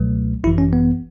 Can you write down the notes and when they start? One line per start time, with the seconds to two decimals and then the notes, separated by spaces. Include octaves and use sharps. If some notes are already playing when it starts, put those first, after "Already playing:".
Already playing: C#2 B2 F#3 A3
0.44 G#1 F#2 E3 E4
0.58 C#4
0.73 B3